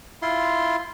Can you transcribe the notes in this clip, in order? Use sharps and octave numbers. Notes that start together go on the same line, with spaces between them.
E4 F4 C6